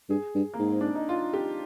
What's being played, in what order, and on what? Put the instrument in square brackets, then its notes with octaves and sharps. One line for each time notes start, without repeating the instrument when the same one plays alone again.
[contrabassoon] G2 [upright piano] G#4
[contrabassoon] G2
[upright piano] A#3
[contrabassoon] G#2
[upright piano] C4
D4
D#4
F4
G4